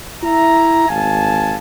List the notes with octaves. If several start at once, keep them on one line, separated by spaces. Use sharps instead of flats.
E4 E5 A#5
G#1 F5 G#5 A5